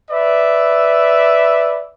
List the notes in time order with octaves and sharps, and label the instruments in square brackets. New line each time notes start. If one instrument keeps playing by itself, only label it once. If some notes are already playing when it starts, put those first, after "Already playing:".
[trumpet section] B4 D5 E5